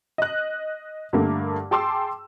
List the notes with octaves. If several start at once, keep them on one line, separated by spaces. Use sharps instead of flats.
D#5 F#6
G2 D3 A3 A#3
G#4 G5 A5 C6 D6 E6